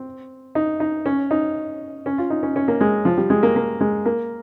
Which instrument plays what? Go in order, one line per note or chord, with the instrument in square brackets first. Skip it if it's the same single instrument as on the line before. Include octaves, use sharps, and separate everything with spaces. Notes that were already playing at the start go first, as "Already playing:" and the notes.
Already playing: [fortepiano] C4
D#4
D#4
C#4
D#4
C#4
F4
D#4
C#4
C#4
A#3
G#3
F3
G3
G#3
A#3
A#3
G#3
A#3